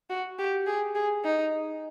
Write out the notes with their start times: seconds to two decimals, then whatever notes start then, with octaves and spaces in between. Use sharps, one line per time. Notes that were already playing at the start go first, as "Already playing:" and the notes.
0.10 F#4
0.39 G4
0.67 G#4
0.95 G#4
1.24 D#4